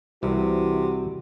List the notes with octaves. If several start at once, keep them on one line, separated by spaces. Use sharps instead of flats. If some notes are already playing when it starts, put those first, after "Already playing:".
C2 C3 E3 F#4